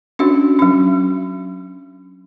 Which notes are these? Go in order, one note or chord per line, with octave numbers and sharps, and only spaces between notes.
C#4 D4 F#4
F#3 C#4